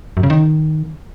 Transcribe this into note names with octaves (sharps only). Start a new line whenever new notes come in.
F#2
C#3
D#3